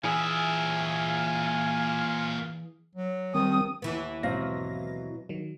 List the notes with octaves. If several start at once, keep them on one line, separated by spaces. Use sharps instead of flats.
A#2 E3 G#4 E5 F5 G#5
F#3
D#3 G3 C4 D#6
D#2 E3 B3
G#2 B2 F#3 C4 F5 A#6
D#3 F#3